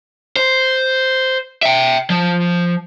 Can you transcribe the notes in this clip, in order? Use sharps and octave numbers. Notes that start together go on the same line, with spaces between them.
C5
E5 G5
F3